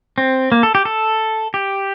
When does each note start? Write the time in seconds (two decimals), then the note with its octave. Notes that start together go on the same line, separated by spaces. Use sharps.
0.18 C4
0.52 A#3
0.63 A4
0.75 G4
0.85 A4
1.54 G4